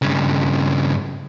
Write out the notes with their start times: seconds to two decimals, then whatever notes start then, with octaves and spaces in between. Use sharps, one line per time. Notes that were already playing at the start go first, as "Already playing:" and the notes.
0.02 G2 C#3